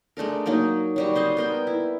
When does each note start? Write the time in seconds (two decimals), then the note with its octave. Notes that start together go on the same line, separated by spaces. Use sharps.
0.17 G#3 A3 D4 A#4
0.46 F#3 A#3 D#4 A#4
0.96 F#3 G3 F#4
1.15 C4 C5 D#5
1.37 B3 A#4 G5
1.67 E4